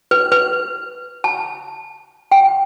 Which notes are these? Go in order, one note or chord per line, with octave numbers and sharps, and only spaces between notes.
B4
B4
A5
G5